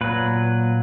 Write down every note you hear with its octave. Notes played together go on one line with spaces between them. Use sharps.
A#2 F#3 B4